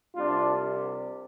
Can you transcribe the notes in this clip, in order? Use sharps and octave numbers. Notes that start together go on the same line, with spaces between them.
C2 C3 G3 D4 F4